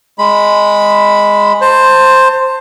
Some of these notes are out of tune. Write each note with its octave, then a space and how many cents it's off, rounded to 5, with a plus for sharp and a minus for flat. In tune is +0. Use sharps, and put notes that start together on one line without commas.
G#3 +0 B5 +0
C5 +5 A5 +30